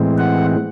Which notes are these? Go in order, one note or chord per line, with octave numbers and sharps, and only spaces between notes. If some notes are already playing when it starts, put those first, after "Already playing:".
Already playing: A2 E3 G#3 C4
F#5